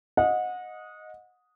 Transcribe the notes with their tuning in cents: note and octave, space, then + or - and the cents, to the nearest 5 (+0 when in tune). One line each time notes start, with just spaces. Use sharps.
D#5 +0 F#5 -30